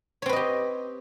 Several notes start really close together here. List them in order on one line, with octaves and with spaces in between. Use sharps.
C#5 C4 B4 D#5 G4